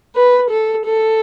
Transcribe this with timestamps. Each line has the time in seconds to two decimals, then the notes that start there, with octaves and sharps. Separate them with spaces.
0.15 B4
0.50 A4
0.86 A4